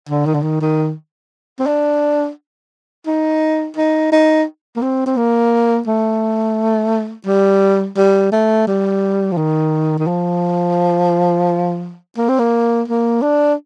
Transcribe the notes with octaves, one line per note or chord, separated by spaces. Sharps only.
D3
D#3
D3
D#3
D#3
C4
D4
D#4
D#4
D#4
A#3
C4
C4
A#3
A3
G3
G3
A3
G3
F3
D#3
D#3
F3
A#3
C4
A#3
A#3
D4